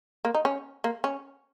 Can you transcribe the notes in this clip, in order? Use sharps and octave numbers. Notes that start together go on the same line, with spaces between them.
A#3
D#4
C#4
A#3
C#4